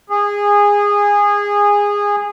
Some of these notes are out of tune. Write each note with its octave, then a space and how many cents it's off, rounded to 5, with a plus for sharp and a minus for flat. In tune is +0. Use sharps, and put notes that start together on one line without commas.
G#4 -20